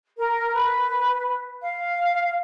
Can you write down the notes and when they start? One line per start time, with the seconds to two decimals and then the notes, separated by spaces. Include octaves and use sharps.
0.17 A#4
0.53 B4
1.62 F5